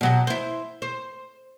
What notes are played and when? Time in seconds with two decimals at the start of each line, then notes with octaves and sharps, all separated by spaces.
0.01 B2 F#3 G4
0.27 E4 C5
0.82 C5